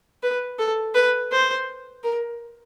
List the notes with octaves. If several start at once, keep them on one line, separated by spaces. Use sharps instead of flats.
B4
A4
B4
C5
A#4